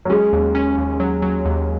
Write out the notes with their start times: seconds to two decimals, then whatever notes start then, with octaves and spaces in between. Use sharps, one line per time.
0.05 F#3
0.10 G#3 C#4
0.33 D#2
0.55 C#4
0.77 D#2
1.00 F#3
1.22 F#3
1.45 D#2